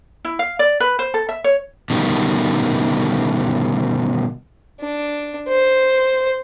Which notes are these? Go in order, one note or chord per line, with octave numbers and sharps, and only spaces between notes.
E4
F5
D5
B4
C5
A4
E5
C#5
B2 D3 D#3 G3
D4
C5